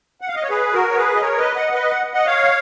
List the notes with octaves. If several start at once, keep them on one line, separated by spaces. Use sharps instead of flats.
F#5
F5
D#5
C#5
G#4 B4
F#4 A#4
C#5
G#4 B4
D#5
A#4 C#5
B4 D#5
D#5 F#5
B4 D#5
F#5
D#5 F#5
C#5 F5